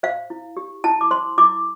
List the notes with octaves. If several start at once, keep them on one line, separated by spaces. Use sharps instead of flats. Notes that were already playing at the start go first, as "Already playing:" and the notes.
C5 F5
E4
G4
E4 A5
D6
C5 C6
E4 D6